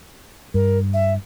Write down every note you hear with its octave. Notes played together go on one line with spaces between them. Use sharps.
G2 A#4
E5